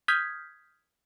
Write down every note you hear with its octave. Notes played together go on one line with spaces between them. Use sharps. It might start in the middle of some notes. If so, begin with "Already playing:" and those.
D#6 F6 G6 G#6 B6